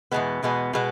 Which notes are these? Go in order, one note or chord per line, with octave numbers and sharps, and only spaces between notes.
E2 B2 G#3 B3
E2 B2 G#3 B3
B2 G#3 B3